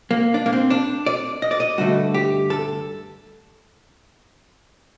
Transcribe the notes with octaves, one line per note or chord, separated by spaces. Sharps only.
A#3
D4
A#3
C4
D4
D5
D#5
D5
D#5
G2 D3 A3 F#4
G4
A4